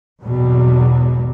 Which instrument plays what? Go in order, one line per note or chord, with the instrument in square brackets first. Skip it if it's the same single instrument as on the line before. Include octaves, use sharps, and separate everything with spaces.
[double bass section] G#1 E2 B2 F#3 G3